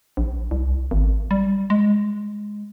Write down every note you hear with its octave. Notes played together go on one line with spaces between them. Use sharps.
A#1
C2
G#1
G3
G#3